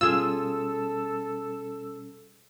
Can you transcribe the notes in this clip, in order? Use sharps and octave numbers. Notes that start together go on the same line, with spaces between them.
B2 G3 C#4 F4 G#4 A4 E6